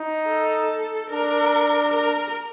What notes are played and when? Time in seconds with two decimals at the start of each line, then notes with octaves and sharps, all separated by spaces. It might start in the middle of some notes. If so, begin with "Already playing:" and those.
Already playing: D#4
0.27 A4
1.10 D4 A#4
1.93 A#4